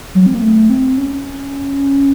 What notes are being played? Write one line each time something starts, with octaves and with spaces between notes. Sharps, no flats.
F#3
C4
A#3
A3
C4
C#4